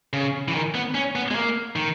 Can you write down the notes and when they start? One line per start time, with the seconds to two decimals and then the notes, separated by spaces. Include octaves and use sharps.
0.13 C#3
0.48 E3
0.55 D#3
0.75 B3
0.95 C#4
1.15 B3
1.31 G#3
1.35 A#3
1.76 D#3